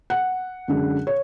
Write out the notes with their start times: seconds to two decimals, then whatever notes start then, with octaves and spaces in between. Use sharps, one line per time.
0.10 F#5
0.68 F#2 D3 G#3
1.07 C#5